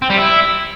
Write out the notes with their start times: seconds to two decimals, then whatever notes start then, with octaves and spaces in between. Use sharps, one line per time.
0.02 C4
0.10 G3
0.18 E4